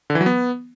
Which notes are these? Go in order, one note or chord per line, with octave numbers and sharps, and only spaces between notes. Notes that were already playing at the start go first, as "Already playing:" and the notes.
D3
E3
F#3
B3